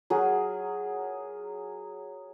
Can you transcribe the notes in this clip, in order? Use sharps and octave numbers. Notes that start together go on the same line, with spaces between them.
F#3 G#4 A#4